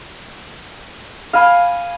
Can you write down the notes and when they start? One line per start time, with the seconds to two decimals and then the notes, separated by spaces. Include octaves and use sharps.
1.33 F5 G#5 B5